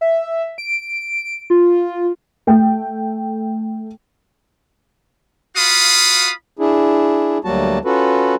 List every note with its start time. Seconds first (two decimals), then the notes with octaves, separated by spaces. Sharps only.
0.01 E5
0.58 D7
1.50 F4
2.47 A3 G5
5.57 F4 F#4 F5 B5 D#6
6.59 D4 E4 G#4
7.44 D2 F#3 G3 A#3 F#4 A5
7.85 C#4 F4 F#4 A4 B4